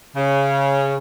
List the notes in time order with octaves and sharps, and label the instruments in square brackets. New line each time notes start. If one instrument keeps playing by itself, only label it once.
[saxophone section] C#3